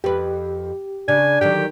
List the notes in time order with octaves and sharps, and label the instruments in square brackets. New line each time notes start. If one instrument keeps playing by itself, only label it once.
[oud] F2 B4 [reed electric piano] G4
[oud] C#3 [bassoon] D4 [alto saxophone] G#5
[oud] D3 D#3 F#3 [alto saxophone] G4